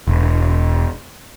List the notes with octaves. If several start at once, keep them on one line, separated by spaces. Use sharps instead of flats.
E1